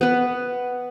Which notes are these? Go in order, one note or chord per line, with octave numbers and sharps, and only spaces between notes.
B3 B4